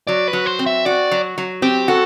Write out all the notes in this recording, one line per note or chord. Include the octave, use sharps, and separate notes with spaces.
F#3 D5
B4
F#3
C5
C4
E5
F#4 D5
F#3
F#3
C4 G4
F#4 A4